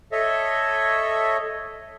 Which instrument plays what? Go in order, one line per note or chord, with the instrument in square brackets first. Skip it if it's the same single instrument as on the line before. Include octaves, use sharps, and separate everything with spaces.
[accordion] A4 C#5 D#5 E5